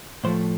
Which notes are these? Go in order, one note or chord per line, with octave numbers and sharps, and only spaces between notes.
A2 F3 A3 C5